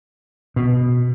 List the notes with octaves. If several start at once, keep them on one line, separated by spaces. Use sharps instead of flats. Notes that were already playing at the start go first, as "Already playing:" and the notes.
B2